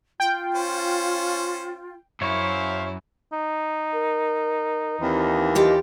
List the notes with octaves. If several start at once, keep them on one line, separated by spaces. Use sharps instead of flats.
F4 G5
C#4 C5
F#2 E4 C5 C#5 E5 F5
D#4
A#4
D#2 E3 C4
F4 G4 A4 D#5